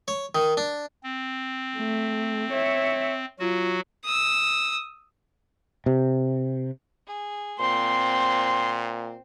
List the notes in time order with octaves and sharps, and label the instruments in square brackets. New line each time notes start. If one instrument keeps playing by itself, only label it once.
[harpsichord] C#5
D#3
D4
[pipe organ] C4
[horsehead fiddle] A3
C#5 E5
[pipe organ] F#3 F#4 [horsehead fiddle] F4
[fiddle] D#6 E6
[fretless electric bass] C3
[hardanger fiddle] G#4
[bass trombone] A#2 [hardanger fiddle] C4 C5 [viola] C6